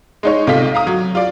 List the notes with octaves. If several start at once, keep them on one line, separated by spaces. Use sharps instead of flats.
G#3 D#4 C#5
B1 C3 A3 F4 D#5 B6
F5 A#5 D#6
F#3
F4 D5